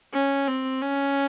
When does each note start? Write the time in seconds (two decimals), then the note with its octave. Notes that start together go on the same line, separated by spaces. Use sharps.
0.13 C#4
0.48 C4
0.82 C#4